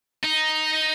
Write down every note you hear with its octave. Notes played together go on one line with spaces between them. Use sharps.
D#4